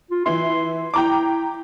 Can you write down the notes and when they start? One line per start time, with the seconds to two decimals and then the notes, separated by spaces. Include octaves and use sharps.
0.11 F4
0.26 E3 E4 C6
0.94 E4 G5 A#5 D6